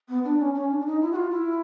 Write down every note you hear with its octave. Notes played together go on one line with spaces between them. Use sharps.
B3
D4
C#4
C#4
D4
D4
D#4
E4
F#4
F4
E4